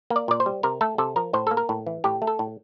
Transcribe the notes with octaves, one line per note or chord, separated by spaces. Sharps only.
A#3
D5
A#2 D5
C5
G3
C3 A#4
A3 A4
C3 A4
F3 A#4
A2 C5
A#3 A4
A#4
A2
E3
A2 G4
A3
A4
A2